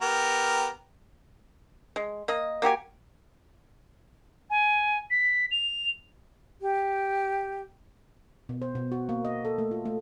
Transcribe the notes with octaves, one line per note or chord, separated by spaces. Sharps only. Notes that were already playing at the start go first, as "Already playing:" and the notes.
B3 G4 A#4
G#3
A#3 D#5
A#3 F#4 G4 G#5
G#5
B6
F7
G4
B2
C5
B2
F#4
A#3
D#5
A4
A3
F4
A3